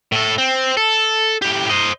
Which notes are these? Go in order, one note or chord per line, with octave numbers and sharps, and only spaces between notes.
A2 A4
C4
A4
A2 G4
C5 D#5